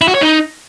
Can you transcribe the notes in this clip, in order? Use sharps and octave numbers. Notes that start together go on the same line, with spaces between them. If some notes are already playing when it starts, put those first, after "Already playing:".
E4
F#4
C#5
D#4